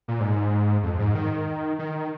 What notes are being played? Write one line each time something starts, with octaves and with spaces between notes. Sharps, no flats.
A#2
G#2
F2
G#2
D#3
D#3